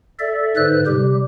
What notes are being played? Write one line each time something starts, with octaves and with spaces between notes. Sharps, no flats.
A4 D5 E5
G#2 D3 B4 C5 F#6
C3 G3 G4